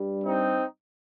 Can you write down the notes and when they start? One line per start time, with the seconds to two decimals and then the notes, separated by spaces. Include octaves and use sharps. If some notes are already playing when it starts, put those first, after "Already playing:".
Already playing: G2 G3
0.23 C4 D#4